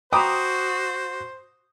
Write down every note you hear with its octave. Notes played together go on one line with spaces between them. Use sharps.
F#4 C5 G5 A#5 B5 D6 D#6